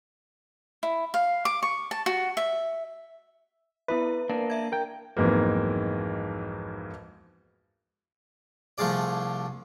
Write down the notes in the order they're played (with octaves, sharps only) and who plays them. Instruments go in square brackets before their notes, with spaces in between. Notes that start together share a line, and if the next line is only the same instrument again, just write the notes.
[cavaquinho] E4
F5
D6
C#6
A5
F#4
E5
[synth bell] B3 E4 E5 [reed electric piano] B4
[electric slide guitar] A#3 D4 [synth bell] A#4
[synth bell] E5 G#6
[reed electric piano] A#4 G5
[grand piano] B1 F2 G#2 E3 A#3
[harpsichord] C2 F3 A3 F4 G#4 D5